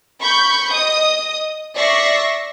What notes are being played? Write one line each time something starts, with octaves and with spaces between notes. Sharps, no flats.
B5 C#6 G6
D#5 D#6
D5 E5 C#6 A#6 C7